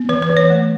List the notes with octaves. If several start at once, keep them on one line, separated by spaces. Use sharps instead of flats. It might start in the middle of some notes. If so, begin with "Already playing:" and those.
Already playing: B3
E3 B4
B4
E3
C#5
A3